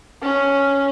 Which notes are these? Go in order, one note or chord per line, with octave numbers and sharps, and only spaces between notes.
C#4